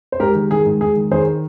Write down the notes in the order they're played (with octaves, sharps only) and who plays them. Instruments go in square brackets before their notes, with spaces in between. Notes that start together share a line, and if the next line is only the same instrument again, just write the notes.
[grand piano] C5
G#2 G4 A#4
D#3
D#3 G#4
G#2
G#2 G#4
D#3
D#3 G#4 C5